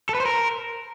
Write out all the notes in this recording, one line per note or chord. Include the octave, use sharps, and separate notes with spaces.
A4
B4
C5
A#4